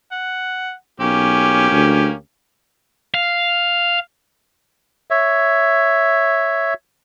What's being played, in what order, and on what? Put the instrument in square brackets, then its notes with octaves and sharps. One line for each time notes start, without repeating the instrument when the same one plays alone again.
[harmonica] F#5
[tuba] B1 [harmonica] A#3 C#4 G4
[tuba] D2
[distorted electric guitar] F5
[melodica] C#5 E5